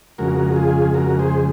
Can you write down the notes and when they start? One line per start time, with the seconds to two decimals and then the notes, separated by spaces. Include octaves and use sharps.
0.18 F2 C#3 G#3 F#4 A#4
0.56 F4 G#4
0.94 F#4 A#4
1.19 G#4 C5